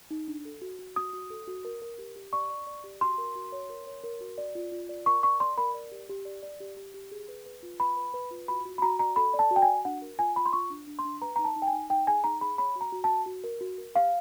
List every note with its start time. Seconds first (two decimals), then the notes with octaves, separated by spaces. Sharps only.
0.11 D#4
0.28 D4
0.45 A4
0.62 F#4
0.79 F#4
0.96 F#4 D#6
1.13 F#4
1.30 A4
1.48 F#4
1.65 A#4
1.82 A#4
1.98 G4
2.16 G4
2.33 D5 C#6
2.50 D5
2.67 D5
2.84 G4
3.01 F#4 C6
3.18 A#4
3.36 F#4
3.52 C#5
3.70 A#4
3.87 C#5
4.04 A#4
4.21 F#4
4.38 D5
4.55 F4
4.72 F4
4.89 D5
5.06 A#4 C#6
5.23 D5 C#6
5.40 D5 C6
5.57 A#4 B5
5.74 D5
5.92 G4
6.09 G4
6.25 D5
6.43 D5
6.60 G4
6.77 G4
6.94 G4
7.12 G#4
7.28 B4
7.46 B4
7.63 F4
7.80 B4 B5
7.97 B4
8.14 B4
8.31 F4
8.48 F#4 B5
8.65 F#4
8.78 B5
8.82 F#4 A#5
8.99 D5 A#5
9.16 A4 B5
9.34 D5
9.39 A5
9.51 F#4
9.56 G5
9.62 G#5
9.68 F#4
9.85 D4 F#5
10.02 A#4
10.19 F4 G#5
10.36 F4 B5
10.46 C6
10.53 F4 C#6
10.70 D4
10.87 D4
10.99 C6
11.05 D4
11.22 B4 A#5
11.36 D#4 A#5
11.44 A5
11.56 D#4
11.62 G5
11.67 G#5
11.73 D#4
11.90 D#4 G5
12.07 G#4 G#5
12.24 D#4 A#5
12.41 G#4 B5
12.58 C#5 B5
12.76 F#4
12.81 A#5
12.92 F#4
13.04 A5
13.10 F#4
13.26 F#4
13.44 A#4
13.61 F#4
13.78 A#4
13.95 G4 F5